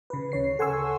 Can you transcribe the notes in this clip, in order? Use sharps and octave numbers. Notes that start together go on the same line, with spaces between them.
C#3 B4
D2 C#3 C#5 C7
A4 F#5 G#5 C6 C#6 E6